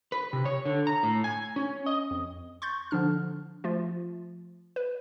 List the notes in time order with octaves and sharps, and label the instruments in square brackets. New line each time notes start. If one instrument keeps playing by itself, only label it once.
[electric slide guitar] B4
C3
C#5
D3
A#5
A2
G#5
C#4
D#5
[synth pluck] F2
C6 C#6 G6 A6
D3 F3 D4 F6
F3 A3 F4
B4